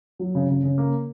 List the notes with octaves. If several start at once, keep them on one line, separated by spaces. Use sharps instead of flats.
F#3
C#3
C#3
C#3
A#3